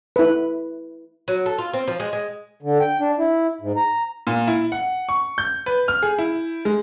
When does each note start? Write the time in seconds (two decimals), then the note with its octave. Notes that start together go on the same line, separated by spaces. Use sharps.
0.16 E4 B4
1.28 F#3
1.46 A4
1.58 F4
1.73 C4
1.88 F3
2.00 G#3
2.13 G#3
2.62 D3
2.80 G5
3.00 D4
3.18 E4
3.61 G#2
3.77 A#5
4.27 A#2
4.48 E4
4.72 F#5
5.09 C#6
5.38 G6
5.66 B4
5.88 F6
6.03 G#4
6.19 E4
6.65 G#3